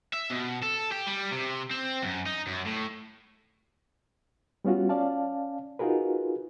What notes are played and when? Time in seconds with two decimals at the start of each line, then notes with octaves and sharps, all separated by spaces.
0.13 E5
0.30 B2
0.63 A4
0.92 G4
1.07 G3
1.32 C3
1.71 C4
2.03 F#2
2.26 D#4
2.47 F#2
2.66 A2
4.65 G3 B3 C#4 F4 F#4
4.89 C#4 D5 F5 A5
5.79 D#4 F4 F#4 G#4 A#4 B4